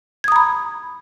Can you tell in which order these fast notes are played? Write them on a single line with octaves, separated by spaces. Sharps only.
G#6 D#6 A#5 B5